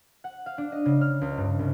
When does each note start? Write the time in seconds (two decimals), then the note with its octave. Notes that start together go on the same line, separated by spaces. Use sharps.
0.24 F#5
0.46 F5
0.58 D4
0.72 D#5
0.86 C#3
1.01 F6
1.21 C#2
1.37 G2
1.59 C2